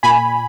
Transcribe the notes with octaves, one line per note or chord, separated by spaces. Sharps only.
A#2 G#5 B5